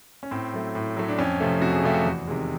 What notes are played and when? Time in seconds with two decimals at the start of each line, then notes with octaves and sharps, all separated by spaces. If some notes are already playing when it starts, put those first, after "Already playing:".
0.23 C#4
0.31 A2 C4
0.54 F#3 A3
0.75 A2
0.97 F#3 A3
1.08 D4
1.19 F2 C#4
1.40 C3 F3 A3
1.62 F2 F#4
1.73 G#4
1.83 C3 F3 A3 G4
1.94 F#4
2.05 E2
2.27 C3 D#3 G#3